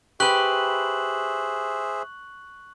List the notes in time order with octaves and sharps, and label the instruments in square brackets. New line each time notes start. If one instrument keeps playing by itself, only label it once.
[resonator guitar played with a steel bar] G4 B4 [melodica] G#4 C5 E5 [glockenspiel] C#6 F#6 F#7